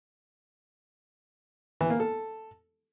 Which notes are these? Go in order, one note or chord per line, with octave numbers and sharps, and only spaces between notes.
E3
A#3
A4